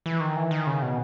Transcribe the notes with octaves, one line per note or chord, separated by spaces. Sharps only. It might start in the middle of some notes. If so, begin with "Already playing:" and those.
E3
D#3
E3
D#3
C#3
B2